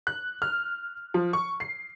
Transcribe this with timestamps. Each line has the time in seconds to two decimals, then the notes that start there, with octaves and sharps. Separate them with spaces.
0.07 F#6
0.42 F6
1.14 F3
1.33 C#6
1.60 C7